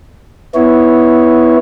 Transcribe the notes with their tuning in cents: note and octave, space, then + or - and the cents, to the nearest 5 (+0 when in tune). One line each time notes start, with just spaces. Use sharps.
B3 +0 E4 -10 C#5 +0